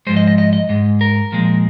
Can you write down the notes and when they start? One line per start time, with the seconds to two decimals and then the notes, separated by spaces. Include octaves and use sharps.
0.07 G#2 F3 G#3 C5
0.17 D#5
0.28 D#5
0.38 D#5
0.53 D#5
0.69 G#2 G#3
1.01 A#4
1.32 A#2 F3 G#3